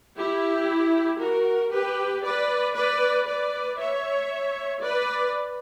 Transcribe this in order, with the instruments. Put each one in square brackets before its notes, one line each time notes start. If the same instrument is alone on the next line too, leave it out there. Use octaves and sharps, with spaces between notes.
[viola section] E4 G4
F#4 A#4
G4 B4
B4 D5
B4 D5
B4 D5
C#5 E5
B4 D5